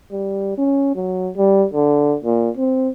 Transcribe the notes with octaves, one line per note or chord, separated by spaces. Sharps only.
G3
C#4
F#3
G3
D3
A#2
C4